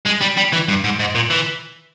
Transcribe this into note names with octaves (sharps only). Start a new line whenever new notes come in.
G#3
G3
G3
E3
G2
G#2
G#2
A#2
E3